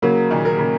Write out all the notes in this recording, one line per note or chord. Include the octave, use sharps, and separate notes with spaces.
C#3 F#3 A#3
A#2 D#3
A#4
C#3